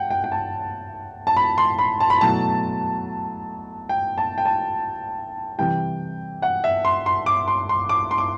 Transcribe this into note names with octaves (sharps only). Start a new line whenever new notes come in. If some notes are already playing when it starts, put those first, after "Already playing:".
Already playing: F#5 G5
G5
G5
A5
A5
B5
C6
B5
A5
B5
B2 F#3 A3 E4 A5
G5
A5
G5
A5
C3 E3 G3 G5
F#5
E5
C6
C6
D6
C6
C6
D6
C6
D6